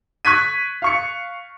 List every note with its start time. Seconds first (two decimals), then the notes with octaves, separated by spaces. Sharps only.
0.25 C#6 F#6 G#6 B6 D#7
0.82 F5 C#6 C#7